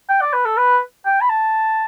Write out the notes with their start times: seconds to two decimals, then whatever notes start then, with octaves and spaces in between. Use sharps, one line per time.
0.09 G5
0.21 D5
0.33 B4
0.45 A4
0.57 B4
1.05 G5
1.21 B5
1.29 A5